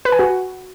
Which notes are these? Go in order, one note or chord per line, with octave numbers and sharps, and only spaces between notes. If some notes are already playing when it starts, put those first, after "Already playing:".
B4
G#5
F#4